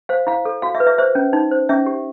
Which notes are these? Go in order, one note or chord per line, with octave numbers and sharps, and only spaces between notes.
C5 F5
E4 F5
A4
F#4 F5
E5
B4
E5
C5 E5
C#4
D#4
C5
C#4 E5
G4